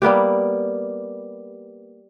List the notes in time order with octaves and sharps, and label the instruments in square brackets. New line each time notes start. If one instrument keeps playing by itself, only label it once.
[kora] G3 A#3 B3 G4